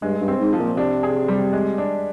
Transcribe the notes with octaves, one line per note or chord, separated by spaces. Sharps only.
G2 G#3
G2
C4
G#2
F3
A#2
C3 D4
G#4
G3
G#3
D4